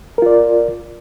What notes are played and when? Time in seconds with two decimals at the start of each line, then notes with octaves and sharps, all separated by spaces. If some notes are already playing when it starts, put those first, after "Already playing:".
0.18 A#4
0.22 F4
0.26 D5